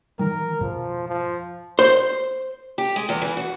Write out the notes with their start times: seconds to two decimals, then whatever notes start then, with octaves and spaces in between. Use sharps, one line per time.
0.19 D#3 E3 G3 A#4
0.61 F2 G#2 B2 F3
1.08 F3
1.79 C5
2.78 G4
2.96 G#3
3.09 E2
3.22 E3
3.37 F#4